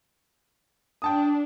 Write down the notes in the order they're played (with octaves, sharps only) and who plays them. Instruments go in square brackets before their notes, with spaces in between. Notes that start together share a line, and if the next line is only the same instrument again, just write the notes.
[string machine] D4 [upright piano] G5 A5 D#6